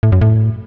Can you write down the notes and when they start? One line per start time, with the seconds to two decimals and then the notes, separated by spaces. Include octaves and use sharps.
0.03 A2
0.12 F#2
0.21 A2